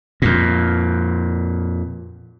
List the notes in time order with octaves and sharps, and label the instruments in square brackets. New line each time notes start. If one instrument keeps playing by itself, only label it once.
[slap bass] F2 A#2